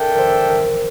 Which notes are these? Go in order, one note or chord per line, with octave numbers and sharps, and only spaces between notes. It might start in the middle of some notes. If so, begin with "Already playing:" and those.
Already playing: D4 A4 A#4 E5 G5
A#4
C5
A#4